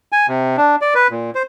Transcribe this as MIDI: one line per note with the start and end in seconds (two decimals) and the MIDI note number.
0.12 0.27 80
0.28 0.56 48
0.57 0.76 62
0.82 0.94 74
0.95 1.08 71
1.11 1.31 46
1.35 1.43 72